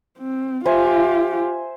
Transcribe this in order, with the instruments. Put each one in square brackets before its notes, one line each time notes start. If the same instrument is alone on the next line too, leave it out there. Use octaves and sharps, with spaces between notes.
[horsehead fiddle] C4
[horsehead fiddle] F4 G4 [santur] C5 E5 G#5